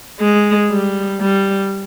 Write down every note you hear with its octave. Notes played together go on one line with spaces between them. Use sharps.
G#3
G3
G3